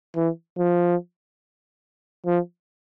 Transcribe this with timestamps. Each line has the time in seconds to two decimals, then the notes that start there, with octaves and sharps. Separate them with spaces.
0.16 E3
0.58 F3
2.26 F3